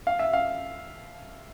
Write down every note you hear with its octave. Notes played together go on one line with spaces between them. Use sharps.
F5
E5
F5